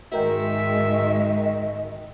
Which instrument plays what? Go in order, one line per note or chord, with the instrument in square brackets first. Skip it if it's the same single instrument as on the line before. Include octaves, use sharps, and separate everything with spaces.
[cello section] G#2 D#3 G#3 [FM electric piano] F#4 A#4 G5 [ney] D#5 [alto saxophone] E5